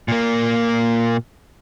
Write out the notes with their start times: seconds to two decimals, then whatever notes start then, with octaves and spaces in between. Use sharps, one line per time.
0.08 A#2 A#3